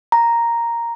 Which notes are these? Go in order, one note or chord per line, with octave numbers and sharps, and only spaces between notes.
A#5